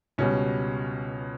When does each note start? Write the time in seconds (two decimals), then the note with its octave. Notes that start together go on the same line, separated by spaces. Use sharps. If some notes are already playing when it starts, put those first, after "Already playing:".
0.18 C#2 B2 G3 C#4